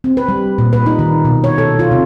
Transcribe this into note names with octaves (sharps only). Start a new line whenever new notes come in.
C4
B4
G3
A#2
B4
D#4
D#3
B2
C#5
A4
F4
C3